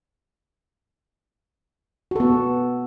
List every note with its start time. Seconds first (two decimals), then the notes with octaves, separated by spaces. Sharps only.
2.11 F#4
2.16 A4
2.20 B3